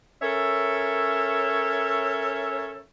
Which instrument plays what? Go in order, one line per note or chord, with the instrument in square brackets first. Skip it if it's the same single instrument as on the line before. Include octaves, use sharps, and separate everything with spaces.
[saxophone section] C#4 A4 A#4 C#5 E5